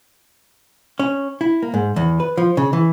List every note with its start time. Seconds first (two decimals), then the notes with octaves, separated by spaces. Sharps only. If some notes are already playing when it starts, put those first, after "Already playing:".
0.99 C#4
1.41 E4
1.62 A#3
1.74 G#2
1.96 E2
2.20 B4
2.37 F3
2.57 C#3
2.73 E3